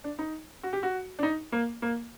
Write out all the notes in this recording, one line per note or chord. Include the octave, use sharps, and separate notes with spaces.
D4
D#4
F#4
G4
F#4
D4
D#4
A#3
A#3